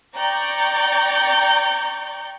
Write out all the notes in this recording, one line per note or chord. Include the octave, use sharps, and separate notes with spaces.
D5 G5 A#5 C#6 G6